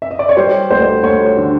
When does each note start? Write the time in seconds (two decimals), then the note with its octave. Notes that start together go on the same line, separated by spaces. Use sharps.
0.02 E5
0.11 D#5
0.19 D5
0.29 C#5
0.37 G3 C5
0.71 D2 C5
1.03 D2 C#5
1.37 D3